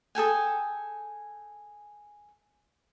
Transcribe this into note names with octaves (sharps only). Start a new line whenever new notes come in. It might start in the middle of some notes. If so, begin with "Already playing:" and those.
G#4 A4 G5 G#5